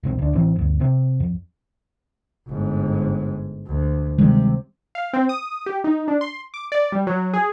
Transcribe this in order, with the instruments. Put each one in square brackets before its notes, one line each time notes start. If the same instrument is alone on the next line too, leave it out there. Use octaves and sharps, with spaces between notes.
[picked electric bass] E1 B1 C4
D2 D4
A1 E3 C4
G1 D2
C3 C4
F2
[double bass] G1 G#2
D2
[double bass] C3 [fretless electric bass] D#3 G3 G#3
[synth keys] F5
C4
D#6
G4
D#4
D4
C6
D6
D5
G3
F#3
G#4